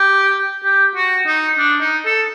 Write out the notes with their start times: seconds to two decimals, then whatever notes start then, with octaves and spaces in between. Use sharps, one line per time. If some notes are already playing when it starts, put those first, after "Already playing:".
Already playing: G4
0.64 G4
0.96 F#4
1.26 D#4
1.58 D4
1.81 D#4
2.05 A4